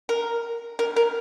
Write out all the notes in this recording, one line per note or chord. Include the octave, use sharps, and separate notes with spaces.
A#4
A#4
A#4